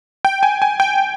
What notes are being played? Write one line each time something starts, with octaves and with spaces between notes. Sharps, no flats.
G5
G#5
G#5
G5